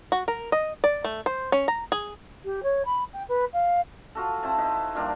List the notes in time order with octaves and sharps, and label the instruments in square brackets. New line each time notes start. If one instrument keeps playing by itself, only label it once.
[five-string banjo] F#4
A#4
D#5
D5
A3
C5
C#4
A#5
G#4
[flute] G4
C#5
B5
G5
B4
F5
[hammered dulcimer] F4 F#4 A4
C4 E4 C5 A5
D#4 E4 B4 C5
F3 G3 A#3 D4